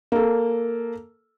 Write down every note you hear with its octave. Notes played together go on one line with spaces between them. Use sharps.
A#3 A4